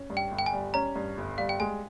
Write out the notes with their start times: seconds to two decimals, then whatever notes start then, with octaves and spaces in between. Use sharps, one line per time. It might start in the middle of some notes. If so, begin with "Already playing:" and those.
Already playing: C#4
0.10 G2
0.17 G5
0.31 G1
0.39 G5
0.46 G#5
0.53 G3
0.74 C#4 A#5
0.96 G2
1.18 G1
1.38 G3 F5
1.49 G5
1.60 G#3 G#5